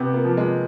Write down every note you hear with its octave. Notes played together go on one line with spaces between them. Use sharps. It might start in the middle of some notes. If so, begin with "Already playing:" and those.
Already playing: C3 B3
A#3
F3
G#3